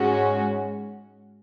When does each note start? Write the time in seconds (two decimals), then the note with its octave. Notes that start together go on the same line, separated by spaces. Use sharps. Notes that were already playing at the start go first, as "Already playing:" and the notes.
Already playing: G#2 G#3 C#4 F#4